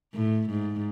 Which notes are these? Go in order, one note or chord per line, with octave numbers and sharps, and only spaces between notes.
A2
G#2